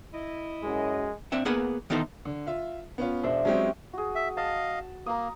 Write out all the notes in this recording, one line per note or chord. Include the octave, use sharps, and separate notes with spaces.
E4 D#5
F#2 G#3
C4 D4 E5 F#5
A#3 B3 G#4 B4 F#5
D#3 E3 B3 D#4 A4 C5
D3
F4 E5
B3 C#4 F4
E1 D4 C5 E5
F#3 G#3 C4 C#4 G4
F#4 G#4
E5
D#5 F5 A5
A#3 A#5 D#6